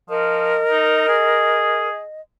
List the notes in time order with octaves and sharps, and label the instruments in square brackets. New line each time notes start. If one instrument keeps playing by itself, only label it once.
[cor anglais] F3 [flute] A#4 [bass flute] D#5
[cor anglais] D#4
G#4